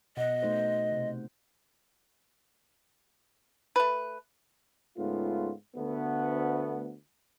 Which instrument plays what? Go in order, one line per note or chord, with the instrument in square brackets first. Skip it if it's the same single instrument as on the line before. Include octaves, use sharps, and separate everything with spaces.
[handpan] B2 F#5 [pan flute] D#5
[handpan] A3 D#4 C5
C3 C5
[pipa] A3 B4
[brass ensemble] G#2 C#3 A3 B3 F4
D2 A3 B3